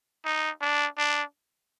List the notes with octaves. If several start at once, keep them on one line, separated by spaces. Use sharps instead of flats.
D#4
D4
D4